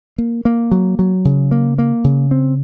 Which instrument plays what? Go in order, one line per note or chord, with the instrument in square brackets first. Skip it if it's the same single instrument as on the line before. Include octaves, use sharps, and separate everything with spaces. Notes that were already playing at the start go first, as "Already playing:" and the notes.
[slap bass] A#3
A#3
F#3
F#3
C#3
A#3
A#3
C#3
C4